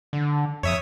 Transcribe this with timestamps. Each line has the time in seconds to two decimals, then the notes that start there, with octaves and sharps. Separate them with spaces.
0.13 D3
0.63 F2 C#5 E5 D#6